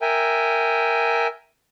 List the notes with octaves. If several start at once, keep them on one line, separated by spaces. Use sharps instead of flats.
A#4 E5 G5 G#5